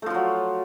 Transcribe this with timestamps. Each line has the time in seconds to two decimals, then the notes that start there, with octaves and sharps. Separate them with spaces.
0.02 A3
0.06 F3
0.10 F4
0.14 F#3